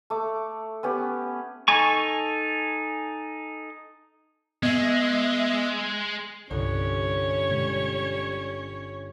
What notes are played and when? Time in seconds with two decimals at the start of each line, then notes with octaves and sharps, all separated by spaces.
0.10 A3 D6
0.83 B3 C#4 G4
1.68 D#4 A4 G#5 C#6
4.63 G#3 B3 D#5 E5 G#6
6.51 G1 C2 G3 C#4 C#5
7.49 B2 D3 G#3